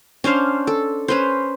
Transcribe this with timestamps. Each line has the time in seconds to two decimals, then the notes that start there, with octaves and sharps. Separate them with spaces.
0.24 C#4 D4 C5 F5
0.67 A4
1.08 C#4 B4 C5